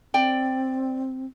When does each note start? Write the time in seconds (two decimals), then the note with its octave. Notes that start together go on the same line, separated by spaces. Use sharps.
0.14 C4 D5 G5